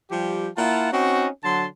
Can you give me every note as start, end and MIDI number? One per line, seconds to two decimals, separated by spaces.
0.11 0.48 53
0.11 0.48 55
0.11 0.48 67
0.57 0.92 58
0.57 0.92 64
0.57 0.92 65
0.57 0.92 78
0.57 0.92 81
0.92 1.27 60
0.92 1.27 61
0.92 1.27 63
0.92 1.27 66
1.44 1.67 50
1.44 1.67 54
1.44 1.67 81
1.44 1.67 84